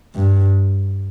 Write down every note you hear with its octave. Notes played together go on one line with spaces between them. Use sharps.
G2